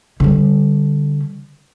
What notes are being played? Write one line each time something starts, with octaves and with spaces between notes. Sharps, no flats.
D3 G3